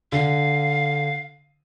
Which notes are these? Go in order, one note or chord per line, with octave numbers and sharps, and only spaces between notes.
D3 F5